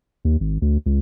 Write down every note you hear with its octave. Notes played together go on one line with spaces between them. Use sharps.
D#2
G#1
D2
C#2